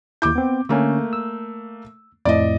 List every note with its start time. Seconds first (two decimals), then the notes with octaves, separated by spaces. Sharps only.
0.22 D#2 E4 D6 G6
0.35 B3 C4
0.69 D3 A3 A#3 C#4
1.13 E6
2.25 F2 A2 D5 D#5